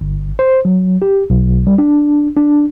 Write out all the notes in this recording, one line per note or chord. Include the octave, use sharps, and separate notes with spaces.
G1
C5
F#3
G4
B1
G3
D4
D4